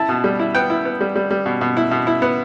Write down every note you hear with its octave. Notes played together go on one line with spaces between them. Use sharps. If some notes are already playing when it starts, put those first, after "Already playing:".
Already playing: E4 A5
B2
G3
E4
B3 G5
E4
B3
G3
G3
G3
B2
B2
E4
B2
E4
B3